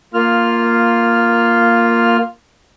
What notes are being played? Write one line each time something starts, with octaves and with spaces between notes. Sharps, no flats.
A#3 F4 F6